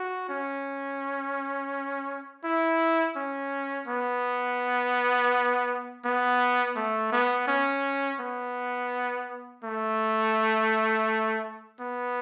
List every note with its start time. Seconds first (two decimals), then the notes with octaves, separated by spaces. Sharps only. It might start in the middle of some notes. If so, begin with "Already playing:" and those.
Already playing: F#4
0.29 C#4
2.44 E4
3.16 C#4
3.88 B3
6.05 B3
6.76 A3
7.13 B3
7.48 C#4
8.20 B3
9.64 A3
11.80 B3